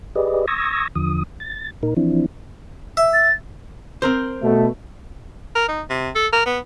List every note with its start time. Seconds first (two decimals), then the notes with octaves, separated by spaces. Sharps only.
0.15 G4 G#4 B4 D5 D#5
0.48 C#6 D#6 E6 G#6 A#6
0.95 E2 D3 F3 D#6
1.40 A6
1.83 A#2 D#4 A#4
1.97 E3 F3 C4 D4 E4
2.97 E5
3.14 A6
4.02 C4 A#4 C5
4.42 B2 A3
5.56 A#4
5.69 D#4
5.90 C3
6.16 A4
6.33 A#4
6.46 B3